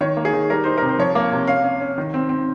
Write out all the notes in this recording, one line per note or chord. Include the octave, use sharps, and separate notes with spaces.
D#3 C#5
A#3
G#4
D#3
G3 A#4
D#4 C5
C3 A#4
C5
F3 C#5
A#3
C3
C#4 F5
C#4
C#4
D#3
C4
C4